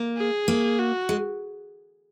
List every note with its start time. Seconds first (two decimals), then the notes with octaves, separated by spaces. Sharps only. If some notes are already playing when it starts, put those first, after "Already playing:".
Already playing: A#3
0.17 G#4
0.48 A#3
0.79 F#4
1.09 G#3